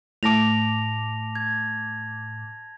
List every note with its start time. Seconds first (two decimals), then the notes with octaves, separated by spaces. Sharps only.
0.23 A2 A5 D6 A#6 F7
1.35 G#6